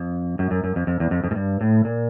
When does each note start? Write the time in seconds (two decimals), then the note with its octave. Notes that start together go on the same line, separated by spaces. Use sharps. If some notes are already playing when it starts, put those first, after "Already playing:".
Already playing: F2
0.39 F#2
0.51 F#2
0.64 F#2
0.76 F2
0.87 F2
1.00 E2
1.11 F2
1.24 F2
1.31 G#2
1.35 G2
1.61 A2
1.85 A#2